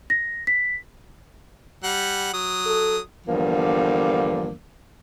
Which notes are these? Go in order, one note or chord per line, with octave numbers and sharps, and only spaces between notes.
A#6
B6
G3 F#5
F#3 D#6
A4
E2 G2 D3 F3 A#3